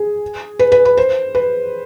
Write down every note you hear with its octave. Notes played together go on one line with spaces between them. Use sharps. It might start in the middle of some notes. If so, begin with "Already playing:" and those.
Already playing: G#4
B4
B4
B4
C5
B4